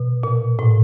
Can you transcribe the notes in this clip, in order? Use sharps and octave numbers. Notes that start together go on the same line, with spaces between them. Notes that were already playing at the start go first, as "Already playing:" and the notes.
Already playing: B2
A#2
A2